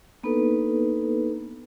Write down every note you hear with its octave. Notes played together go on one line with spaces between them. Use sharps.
A#3 B3 D4 D#4 A4 B4